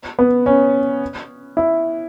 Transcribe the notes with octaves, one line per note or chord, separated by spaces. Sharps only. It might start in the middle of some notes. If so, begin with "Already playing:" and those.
B3
C#4
E4